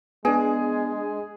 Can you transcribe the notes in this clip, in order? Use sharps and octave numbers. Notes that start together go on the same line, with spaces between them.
G#3 B3 D4 G#4 G#5